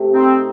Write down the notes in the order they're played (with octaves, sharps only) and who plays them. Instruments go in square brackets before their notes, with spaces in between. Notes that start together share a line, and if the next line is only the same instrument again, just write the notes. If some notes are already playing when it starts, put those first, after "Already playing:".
Already playing: [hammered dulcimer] C3 A3
[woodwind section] C4 [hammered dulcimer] D#4